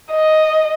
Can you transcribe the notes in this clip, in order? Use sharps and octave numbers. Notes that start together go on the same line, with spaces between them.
D#5